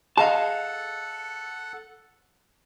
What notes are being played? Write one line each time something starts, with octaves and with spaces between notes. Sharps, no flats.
G#4 A4 D#5 F5 F#5 A5